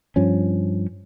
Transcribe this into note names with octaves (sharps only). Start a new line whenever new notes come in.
G2 F3 C#4